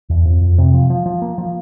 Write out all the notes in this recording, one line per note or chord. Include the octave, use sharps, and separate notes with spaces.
E2
F2
F2
C3
F3
F3
F3
A#3
F3